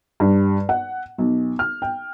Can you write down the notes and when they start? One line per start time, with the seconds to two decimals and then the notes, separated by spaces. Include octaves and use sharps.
0.20 G2
0.69 F#5
1.18 B1
1.59 F6
1.82 G5